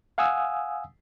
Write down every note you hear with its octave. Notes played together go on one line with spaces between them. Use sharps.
F5 F#5 G#5 D#6 E6